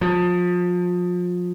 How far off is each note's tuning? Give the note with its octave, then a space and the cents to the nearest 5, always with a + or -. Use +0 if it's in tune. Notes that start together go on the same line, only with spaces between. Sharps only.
F3 +30